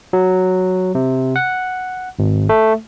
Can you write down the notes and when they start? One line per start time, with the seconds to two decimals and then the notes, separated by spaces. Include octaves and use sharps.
0.13 F#3
0.95 C3
1.36 F#5
2.19 G#1
2.49 A3